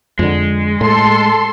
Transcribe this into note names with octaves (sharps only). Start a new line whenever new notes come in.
F2 D3 G#3
A2 A4 C6